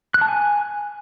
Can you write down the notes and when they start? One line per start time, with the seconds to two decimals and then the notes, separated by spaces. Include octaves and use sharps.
0.14 F#6
0.21 A5
0.28 G#5